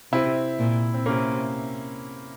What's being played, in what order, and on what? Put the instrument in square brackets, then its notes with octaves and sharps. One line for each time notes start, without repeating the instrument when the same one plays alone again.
[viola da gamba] C3 [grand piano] C4 E4
[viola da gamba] A#2
[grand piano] C4
[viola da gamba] C3 [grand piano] A#3 C#4